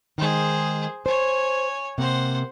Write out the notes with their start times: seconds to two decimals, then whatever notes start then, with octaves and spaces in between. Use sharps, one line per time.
0.18 D#3 G#3 G#4 C5
1.06 C5 C#5 G#5
1.98 C3 A#3 C5 F#5